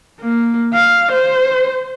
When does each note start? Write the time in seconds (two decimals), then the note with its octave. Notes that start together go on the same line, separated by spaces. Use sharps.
0.21 A#3
0.74 F5
1.12 C5